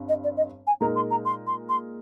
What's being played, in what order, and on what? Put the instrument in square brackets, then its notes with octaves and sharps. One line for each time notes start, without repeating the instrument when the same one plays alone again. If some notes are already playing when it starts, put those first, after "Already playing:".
Already playing: [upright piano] G1 G2 C4
[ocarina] D#5
D5
D#5
G#5
[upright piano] A#2 G#3 D#4 A#4 [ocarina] A#5
[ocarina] C6
A#5
C6
C6
C6